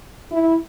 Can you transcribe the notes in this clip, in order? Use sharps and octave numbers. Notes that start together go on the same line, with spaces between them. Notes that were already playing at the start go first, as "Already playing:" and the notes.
E4